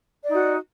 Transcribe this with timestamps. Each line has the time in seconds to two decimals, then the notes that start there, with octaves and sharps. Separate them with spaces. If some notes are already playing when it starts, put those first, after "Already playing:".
0.24 D5
0.29 D#4
0.34 F#4